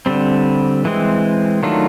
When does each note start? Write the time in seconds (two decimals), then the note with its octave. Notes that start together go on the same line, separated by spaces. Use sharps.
0.06 D3 G3 C4
0.85 E3 G#3 C4
1.63 D#3 F#3 A3 D4 F4